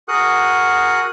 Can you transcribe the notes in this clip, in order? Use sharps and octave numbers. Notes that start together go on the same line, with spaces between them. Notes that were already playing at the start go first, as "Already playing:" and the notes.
F#4 G#4 A#4 F#5 D#6 F#6